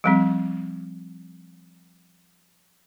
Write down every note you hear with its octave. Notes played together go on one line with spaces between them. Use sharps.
F3 G3 C4